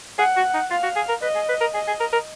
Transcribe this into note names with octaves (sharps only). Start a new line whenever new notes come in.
G#4 F#5
F#4
D#4
F4 F5
F#4
G#4
A#4
B4 D#5
G#4
B4
A#4
G#4 D#5
G#4
A#4
A#4